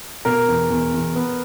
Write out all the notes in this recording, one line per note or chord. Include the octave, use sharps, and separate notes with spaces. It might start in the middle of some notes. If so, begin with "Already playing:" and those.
B2 A#4
E2
E2
E2
B3